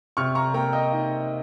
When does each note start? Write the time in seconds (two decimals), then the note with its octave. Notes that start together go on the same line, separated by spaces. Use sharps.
0.17 C3 C#6 F6
0.35 A#5 C#6
0.54 A#3 G5 A#5
0.73 D#5 G5
0.92 D#4